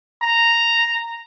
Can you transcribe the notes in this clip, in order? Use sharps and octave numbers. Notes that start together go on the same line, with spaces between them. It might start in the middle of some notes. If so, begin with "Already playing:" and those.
A#5